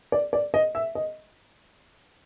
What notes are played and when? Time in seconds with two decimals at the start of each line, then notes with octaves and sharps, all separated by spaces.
0.12 D5
0.33 D5
0.54 D#5
0.75 E5
0.95 D#5